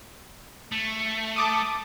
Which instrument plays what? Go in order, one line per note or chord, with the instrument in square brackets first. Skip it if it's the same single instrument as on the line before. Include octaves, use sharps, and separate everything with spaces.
[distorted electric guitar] A3
[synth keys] A5 D6 D#6